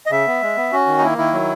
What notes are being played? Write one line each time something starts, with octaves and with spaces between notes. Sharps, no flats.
D#5
C#3 E5
B3
G#3
B3
C#4 F#4
D#3
D#4
A#3 E4
D#3 E4
F#3